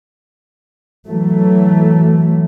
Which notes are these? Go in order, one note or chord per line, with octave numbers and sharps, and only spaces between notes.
E3 F#3 A3